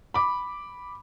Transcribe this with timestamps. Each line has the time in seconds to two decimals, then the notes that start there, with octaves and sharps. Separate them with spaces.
0.14 B5 D6